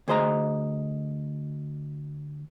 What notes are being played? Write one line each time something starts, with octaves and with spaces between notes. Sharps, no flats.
D2 G#4 C5 D#5 A#5